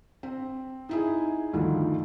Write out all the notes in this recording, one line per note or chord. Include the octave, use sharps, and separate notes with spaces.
C4
D#4 E4 G#4
D2 G2 D#3 F3 A3